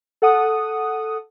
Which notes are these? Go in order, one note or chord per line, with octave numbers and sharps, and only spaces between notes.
A4 F#5 D#6